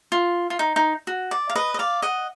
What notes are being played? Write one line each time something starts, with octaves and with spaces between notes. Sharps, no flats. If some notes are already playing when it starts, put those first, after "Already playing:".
F4
F4
D#4
D#4
F#4
D5
F5
B4 D#5
D#5
D5 F5
D#5 F#5